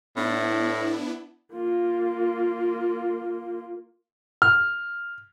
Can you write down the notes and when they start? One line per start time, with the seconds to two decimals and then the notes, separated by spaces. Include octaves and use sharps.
0.16 A2 B3 D4 E4
1.54 A#3 F4
4.42 F6